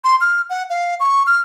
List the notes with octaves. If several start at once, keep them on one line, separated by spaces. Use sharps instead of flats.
C6
F6
F#5
F5
C#6
F6